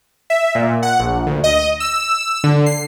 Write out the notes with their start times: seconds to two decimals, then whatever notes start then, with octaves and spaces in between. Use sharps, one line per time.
0.30 E5
0.55 A#2
0.83 F#5
0.99 A#1
1.27 D2
1.44 D#5
1.80 E6
2.44 D3
2.66 C7